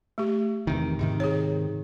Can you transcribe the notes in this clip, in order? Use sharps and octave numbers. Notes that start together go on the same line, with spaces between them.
A3 G4
E2 C3 D#3
G#2 C3 D#3 D#4
G#4 C#5